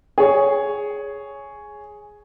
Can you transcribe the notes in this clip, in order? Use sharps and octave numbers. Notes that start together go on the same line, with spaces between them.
G#4 C#5